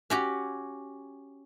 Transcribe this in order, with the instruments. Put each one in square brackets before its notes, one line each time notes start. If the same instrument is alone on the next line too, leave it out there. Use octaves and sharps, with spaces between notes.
[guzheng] C#4 F#4 G4